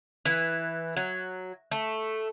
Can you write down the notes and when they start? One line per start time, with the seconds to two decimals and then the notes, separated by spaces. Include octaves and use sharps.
0.25 E3
0.96 F#3
1.71 A3